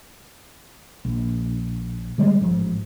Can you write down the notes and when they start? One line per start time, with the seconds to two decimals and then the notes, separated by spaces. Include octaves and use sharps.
1.05 A#1
2.18 D3 G3 G#3
2.41 A1 G#2 F3